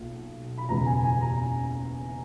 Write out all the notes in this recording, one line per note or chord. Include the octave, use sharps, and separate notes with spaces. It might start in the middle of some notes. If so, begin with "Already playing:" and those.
Already playing: B1 A#2
B5
F#1 E2 B2 G#3 A#5
G#5
G#5
A#5